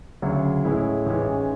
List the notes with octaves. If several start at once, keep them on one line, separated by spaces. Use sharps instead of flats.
D2 C#3 F#3
A2 G#3 C#4 E4
A1 G#2 E3 G#3 C#4